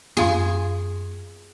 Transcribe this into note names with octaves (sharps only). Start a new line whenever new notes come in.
F#2 B3 F4 G#4 F5 C6